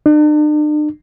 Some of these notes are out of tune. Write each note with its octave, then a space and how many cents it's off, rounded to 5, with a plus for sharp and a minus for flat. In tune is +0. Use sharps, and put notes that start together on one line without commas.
D4 +45